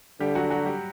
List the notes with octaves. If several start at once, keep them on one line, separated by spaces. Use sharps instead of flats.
D3 G3 G4
F#3 F#4
F#3 F#4
G3 G4